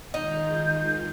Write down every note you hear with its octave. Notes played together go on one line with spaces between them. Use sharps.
D#3 G#3 D#4 F4 G6